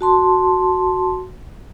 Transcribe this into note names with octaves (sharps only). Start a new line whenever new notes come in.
F#4 A5 C6